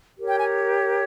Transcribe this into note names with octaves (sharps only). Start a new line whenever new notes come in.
G4 A#4 C#5
G5
G#5